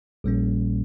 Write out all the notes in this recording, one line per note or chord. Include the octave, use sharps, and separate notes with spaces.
A#1 A#2 G3 A#3 C#4